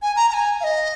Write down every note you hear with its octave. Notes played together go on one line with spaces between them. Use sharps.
G#5
A#5
A#5
G#5
F5
D#5